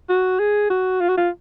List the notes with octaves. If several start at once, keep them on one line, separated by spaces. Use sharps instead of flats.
F#4
G#4
F#4
F4
F#4
F4